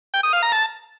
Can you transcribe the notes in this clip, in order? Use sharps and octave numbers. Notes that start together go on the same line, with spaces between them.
G5
D#6
F5
A#5
A5